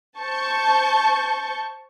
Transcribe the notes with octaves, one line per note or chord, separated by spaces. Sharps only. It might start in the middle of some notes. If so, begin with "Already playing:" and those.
C5 A5 C#6 G6